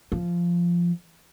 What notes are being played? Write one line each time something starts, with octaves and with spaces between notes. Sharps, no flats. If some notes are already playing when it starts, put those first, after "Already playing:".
F3